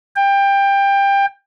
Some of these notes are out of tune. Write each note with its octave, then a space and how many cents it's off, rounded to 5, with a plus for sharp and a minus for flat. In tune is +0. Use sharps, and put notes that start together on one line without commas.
G5 +20